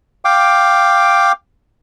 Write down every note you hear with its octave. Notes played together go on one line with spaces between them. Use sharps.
F5 G5 D6